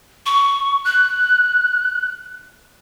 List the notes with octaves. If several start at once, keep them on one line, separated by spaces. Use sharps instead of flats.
C#6
F#6